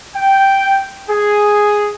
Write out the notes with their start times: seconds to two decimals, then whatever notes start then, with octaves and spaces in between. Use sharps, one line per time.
0.14 G5
1.09 G#4